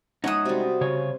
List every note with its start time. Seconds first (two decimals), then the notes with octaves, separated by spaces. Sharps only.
0.24 G#3 C#4 D#4 C#5 E5 F#5 D#6
0.45 C3 G3 F#4
0.81 C#3 C#5